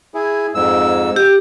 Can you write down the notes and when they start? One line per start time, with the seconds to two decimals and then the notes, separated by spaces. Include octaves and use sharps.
0.14 E4 G#4
0.55 F2 G#2 E6
1.16 G4